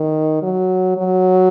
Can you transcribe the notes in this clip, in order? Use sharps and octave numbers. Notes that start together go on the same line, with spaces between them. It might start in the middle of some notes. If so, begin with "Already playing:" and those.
Already playing: D#3
F#3
F#3